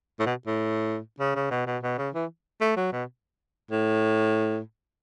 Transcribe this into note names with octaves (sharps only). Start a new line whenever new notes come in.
A2
B2
A2
C#3
C#3
B2
B2
B2
C#3
E3
A3
F#3
B2
A2